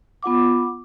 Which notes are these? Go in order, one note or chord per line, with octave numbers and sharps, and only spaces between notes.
B3 F4 F#5 D6